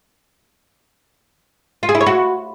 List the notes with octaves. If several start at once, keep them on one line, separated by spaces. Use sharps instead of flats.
F4
G#4
E4
C#5
F#4